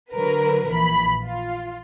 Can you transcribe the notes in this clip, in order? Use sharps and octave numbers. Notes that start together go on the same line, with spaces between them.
D3 F#3 A#4 B4
A#1 E3 B5
F4